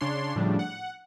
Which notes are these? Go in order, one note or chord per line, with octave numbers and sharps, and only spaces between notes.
C#3 D4 C#5 C6
A2 C#3 F3 G3 D4
F#5